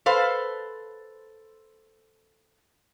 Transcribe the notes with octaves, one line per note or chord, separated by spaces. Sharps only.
A4 B4 C5 F5